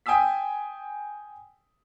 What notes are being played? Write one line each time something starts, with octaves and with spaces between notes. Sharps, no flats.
G5 G#5 D#6 E6 B6